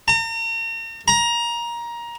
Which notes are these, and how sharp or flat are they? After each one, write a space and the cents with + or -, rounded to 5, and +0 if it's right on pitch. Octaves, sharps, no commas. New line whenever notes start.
A#5 -40
A#5 +20